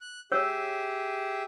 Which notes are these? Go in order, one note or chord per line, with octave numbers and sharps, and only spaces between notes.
F#6
G4 G#4 C#5 E5 E6